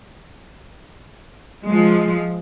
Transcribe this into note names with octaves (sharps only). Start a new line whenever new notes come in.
F3 G#3